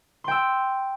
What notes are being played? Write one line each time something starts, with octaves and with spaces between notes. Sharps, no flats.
G5 C6 E6